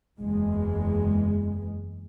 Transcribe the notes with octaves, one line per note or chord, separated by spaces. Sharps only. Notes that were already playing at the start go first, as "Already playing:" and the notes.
F#1 E2 G#3